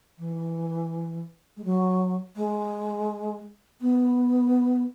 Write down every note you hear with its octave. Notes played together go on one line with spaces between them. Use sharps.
E3
G#3
F#3
G#3
B3